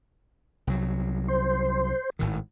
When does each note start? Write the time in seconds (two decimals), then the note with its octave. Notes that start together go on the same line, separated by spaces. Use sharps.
0.67 C2 F#3
1.28 C5
2.19 G#1 A2 D#3